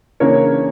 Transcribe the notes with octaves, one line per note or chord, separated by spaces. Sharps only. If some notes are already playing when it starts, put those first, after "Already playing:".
C#3 E3 A#3 D4 A#4 C#5